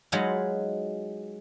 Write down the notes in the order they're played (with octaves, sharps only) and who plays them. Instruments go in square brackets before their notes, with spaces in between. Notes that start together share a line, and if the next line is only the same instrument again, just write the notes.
[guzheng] F#3 G#3 D#4 F4 B4 F#5